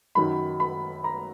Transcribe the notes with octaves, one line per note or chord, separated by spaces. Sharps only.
F#2 D#3 F#3 B5
B5
A#5